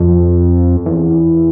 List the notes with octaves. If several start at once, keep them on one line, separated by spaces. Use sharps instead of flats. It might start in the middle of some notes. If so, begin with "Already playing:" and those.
Already playing: F2
E2